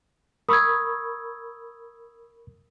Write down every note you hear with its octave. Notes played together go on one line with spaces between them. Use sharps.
A#4 B5 C#6 D#6 E6 G#6